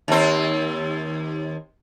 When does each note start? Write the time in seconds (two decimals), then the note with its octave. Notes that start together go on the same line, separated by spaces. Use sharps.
0.08 D#2 C4